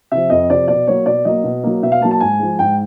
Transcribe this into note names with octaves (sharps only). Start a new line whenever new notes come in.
C3 F3 E5
F2 D#5
C3 F3 D5
B2 D5
F#3 A#3 C#5
B2 D5
F#3 A#3 D#5
B2
F#3 A#3
B2 E5
F5
F#3 A#3 A5
A5
G#2 G#5
F3 G#3
G#2 G5